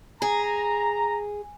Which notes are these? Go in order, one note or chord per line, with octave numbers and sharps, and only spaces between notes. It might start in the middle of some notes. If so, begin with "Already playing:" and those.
G#4 A#5